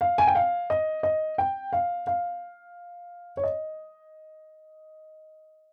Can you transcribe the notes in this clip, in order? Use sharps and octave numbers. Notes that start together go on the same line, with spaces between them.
F5
G#5
G5
F5
D#5
D#5
G5
F5
F5
C#5
D#5